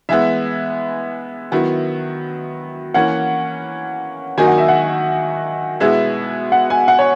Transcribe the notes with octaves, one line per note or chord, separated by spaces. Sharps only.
E3 G#3 B3 E5
D#3 F#3 B3 E4
E3 A#3 C#4 F#5
D#3 F#3 A#3 D#4 F#4 G#5
F#5
E5
F#5
B2 G#3 B3 E4 G#4 E5
F#5
G#5
F#5
C#5